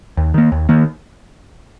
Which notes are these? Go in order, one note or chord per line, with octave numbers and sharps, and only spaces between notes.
D#2
D#3 A#3
D#2
D#3 A#3